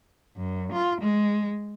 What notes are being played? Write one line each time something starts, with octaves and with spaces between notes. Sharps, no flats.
F#2
F4
G#3